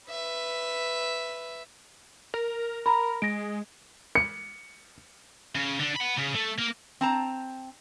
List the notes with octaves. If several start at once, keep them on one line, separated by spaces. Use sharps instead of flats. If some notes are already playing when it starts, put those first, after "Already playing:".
B4 E5
A#4
A#4 A#5 B5
G#3 A#6 D7
C#7
C#3
D3 D4
F#5 B5
C#3
A3
A#3
C4 A5 A#5